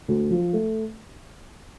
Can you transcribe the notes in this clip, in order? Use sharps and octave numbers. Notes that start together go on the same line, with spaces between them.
D2
F3
A3